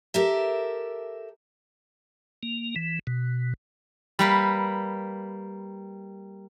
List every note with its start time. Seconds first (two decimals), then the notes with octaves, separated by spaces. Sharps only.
0.14 G4 A4 A#4 E5
2.43 A#3
2.76 E3
3.07 B2
4.19 G3 A#3 B4